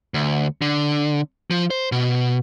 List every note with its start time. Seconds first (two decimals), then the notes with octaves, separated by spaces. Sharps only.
0.14 D2
0.62 D3
1.51 F3
1.70 C5
1.92 B2